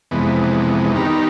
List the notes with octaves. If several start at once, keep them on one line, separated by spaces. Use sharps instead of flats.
F2 C3 E3 G#3 B3
D#3 G3 B3 D#4 G4